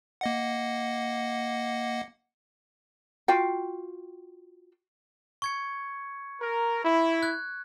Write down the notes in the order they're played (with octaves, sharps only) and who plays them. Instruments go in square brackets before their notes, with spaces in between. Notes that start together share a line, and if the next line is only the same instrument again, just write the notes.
[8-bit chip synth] A#3 D#5 F#5
[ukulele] F4 F#4 F5 G5
[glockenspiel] C#6 G#6 C#7
[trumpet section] A#4
E4
[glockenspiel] F#6 G#6